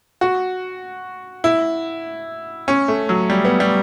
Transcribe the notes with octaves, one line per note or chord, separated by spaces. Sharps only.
F#4
E4
C#4
A3
F#3
G3
B3
G3